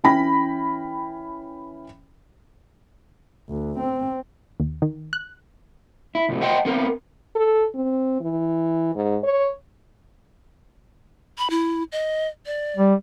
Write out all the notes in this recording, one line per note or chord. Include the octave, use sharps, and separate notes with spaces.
E3 C#4 G5 B5 A#6
D2
C4
D#2
D#3
F#6
E4
C2 F2 C3
C5 D#5 F#5 G5 A5 C6
B3 C4 A#4
A4
C4
E3
G#2
C#5
B5
E4
D#5
D5
G3